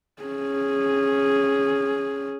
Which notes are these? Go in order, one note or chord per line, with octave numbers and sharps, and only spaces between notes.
C#4 G#4